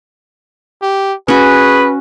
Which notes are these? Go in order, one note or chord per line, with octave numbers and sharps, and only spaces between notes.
G4
C#4 F#4 G#4 B4